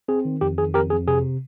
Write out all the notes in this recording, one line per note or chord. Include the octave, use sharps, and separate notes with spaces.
C4 G#4
D#3
F2 G4
D#3 G#4
F2 G4 A#4
F2 G#4
C3 G#4